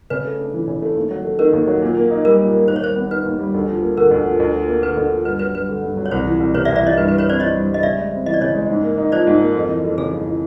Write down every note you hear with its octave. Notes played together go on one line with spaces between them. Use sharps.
C#3 B4
A3
D4
E3
C#3
A3
D#2
F#3
A3
D#3 A#4
D#2
F#3
A#2
A#3
D#4
G3 A#4
A#2
A#3
D#2 C5
C#5
G3 C5
B3
D#3 B4
D#2
G3
D2
F3
A#3
D3 A#4
D2
F3
D2
F3
A#3
D3 B4
D2
F3
G2 B4
F#3 B4
G2 B4
D3
G2
F#3
C#5
C2 C5
E3
C2
C3 B4 C#5
D5 E5
C2
D5 E5
E3 C#5 D#5
G2 B4
B4
G3
B4 C#5
C4 C5 D5
E3 C#5 D#5
G2
G3
D#5
C#3 D5 E5
G#3
C4
E3 D#5
D5
C#3 C#5 D#5
G#3
G#2
A#3
D#4
F3 C5 D5
G#2
A#3
F2
E3
F2
C#3 G#4
F2
E3